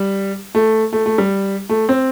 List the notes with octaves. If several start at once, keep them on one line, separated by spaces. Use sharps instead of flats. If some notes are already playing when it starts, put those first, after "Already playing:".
Already playing: G3
A3
A3
A3
G3
A3
C4